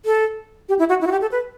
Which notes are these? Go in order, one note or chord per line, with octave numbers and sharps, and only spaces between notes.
A4
G4
E4
F#4
E4
F#4
G4
A4
B4